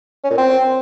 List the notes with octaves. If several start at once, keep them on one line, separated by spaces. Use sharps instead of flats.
C#4
A#2
C4